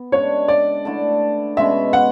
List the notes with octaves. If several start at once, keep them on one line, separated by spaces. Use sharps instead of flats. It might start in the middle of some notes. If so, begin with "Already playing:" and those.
Already playing: B3
C#3 G#3 D4 C#5
D5
D3 A3 E4 A4
B2 G#3 C#4 E5
F#5